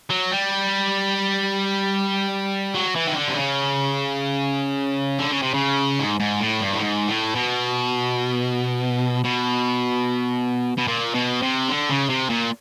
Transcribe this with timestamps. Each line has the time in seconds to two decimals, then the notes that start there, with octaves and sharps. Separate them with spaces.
0.10 F#3
0.31 G3
2.74 F#3
2.95 E3
3.07 D#3
3.16 D3
3.28 C3
3.36 C#3
5.19 D3
5.31 C#3
5.42 C3
5.54 C#3
6.00 G#2
6.20 G#2
6.41 A2
6.61 G2
6.74 A2
6.81 G#2
7.08 A2
7.35 B2
9.25 B2
10.78 B2
10.87 A#2
11.14 B2
11.42 C3
11.69 D3
11.90 C#3
12.10 C3
12.30 A#2